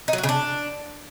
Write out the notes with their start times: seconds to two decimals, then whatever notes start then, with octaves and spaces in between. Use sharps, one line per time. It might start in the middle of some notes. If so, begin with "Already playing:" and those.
0.08 D#4
0.13 F#3
0.18 F#4
0.23 C#3
0.29 D4